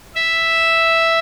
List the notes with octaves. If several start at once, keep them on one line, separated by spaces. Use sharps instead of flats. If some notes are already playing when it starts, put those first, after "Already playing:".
E5